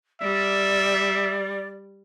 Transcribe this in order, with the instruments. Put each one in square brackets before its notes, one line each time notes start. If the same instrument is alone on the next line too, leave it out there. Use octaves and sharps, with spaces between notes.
[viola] G3 [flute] D5 [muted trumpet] E5